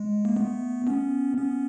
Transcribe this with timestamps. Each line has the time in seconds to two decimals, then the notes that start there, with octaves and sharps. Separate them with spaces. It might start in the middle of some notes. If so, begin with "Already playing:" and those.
Already playing: G#3
0.25 A#3
0.36 A3 B3
0.87 B3 C#4
1.38 B3 C#4